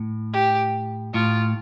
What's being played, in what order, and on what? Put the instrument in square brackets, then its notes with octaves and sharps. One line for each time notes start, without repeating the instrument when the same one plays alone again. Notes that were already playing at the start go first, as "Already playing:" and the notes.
Already playing: [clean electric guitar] A2
[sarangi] G4
[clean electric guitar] A2 [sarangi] F4